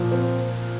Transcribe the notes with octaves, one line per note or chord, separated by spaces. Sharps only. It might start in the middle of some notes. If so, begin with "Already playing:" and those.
Already playing: A#2 F3
C4